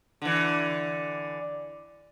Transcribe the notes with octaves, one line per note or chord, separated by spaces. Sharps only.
D3 E3